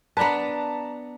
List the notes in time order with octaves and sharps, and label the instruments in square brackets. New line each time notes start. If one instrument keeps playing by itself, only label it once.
[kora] B3 D4 B4 [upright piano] A5 A#5